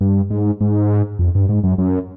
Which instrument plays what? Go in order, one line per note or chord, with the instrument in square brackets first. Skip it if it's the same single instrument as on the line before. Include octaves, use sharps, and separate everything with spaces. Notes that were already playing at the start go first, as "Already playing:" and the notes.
[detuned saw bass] G2
G#2
G#2
F2
G2
G#2
F#2
F#2